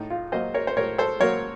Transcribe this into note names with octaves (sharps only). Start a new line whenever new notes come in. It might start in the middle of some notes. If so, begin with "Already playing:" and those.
Already playing: A2 D#4
F4
F#3 A#3 C5 D#5
A#4 C#5
C5
A2 A#4 C#5
A4 C5
F#3 A#3 A#4 C#5